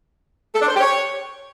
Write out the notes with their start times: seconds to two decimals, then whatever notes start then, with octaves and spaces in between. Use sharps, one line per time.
0.55 A4
0.62 D4
0.68 C5
0.75 G4
0.81 C#5